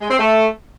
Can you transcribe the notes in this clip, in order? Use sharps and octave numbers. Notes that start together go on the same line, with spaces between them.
G#3
C4
A3